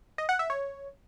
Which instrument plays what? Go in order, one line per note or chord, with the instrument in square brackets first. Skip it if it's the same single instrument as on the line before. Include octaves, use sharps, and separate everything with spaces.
[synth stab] D#5
F#5
E5
C#5